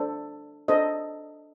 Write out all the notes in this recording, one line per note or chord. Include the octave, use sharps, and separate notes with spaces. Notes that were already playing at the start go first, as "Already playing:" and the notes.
Already playing: D4 A4 C5
D4 A4 C5 D#5